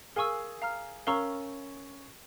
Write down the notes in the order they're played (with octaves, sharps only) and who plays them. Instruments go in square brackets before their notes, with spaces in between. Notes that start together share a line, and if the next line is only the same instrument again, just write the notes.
[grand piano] G#4 [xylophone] A#4 F5 G#5 C#6 E6
[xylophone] F5 A#5 F6
[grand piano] C#4 [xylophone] A#4 F5 A#5 C#6 E6